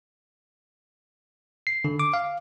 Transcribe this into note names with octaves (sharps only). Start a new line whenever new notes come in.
C7
D3
D6
F5